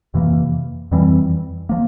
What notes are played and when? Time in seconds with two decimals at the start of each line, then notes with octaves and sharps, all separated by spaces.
0.14 F2 C3 E3 A#3
0.92 F2 E3 G3 C4
1.69 F3 A#3